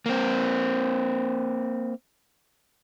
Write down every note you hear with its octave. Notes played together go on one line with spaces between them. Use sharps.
A#3 C4